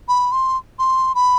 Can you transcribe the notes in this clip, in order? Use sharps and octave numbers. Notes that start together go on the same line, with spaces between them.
B5
C6
C6
B5